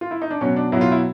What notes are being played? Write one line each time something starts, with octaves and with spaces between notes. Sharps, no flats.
F4
E4
D#4
D4
B2 F#3 C#4
D4
B2 F#3 E4
F4
E4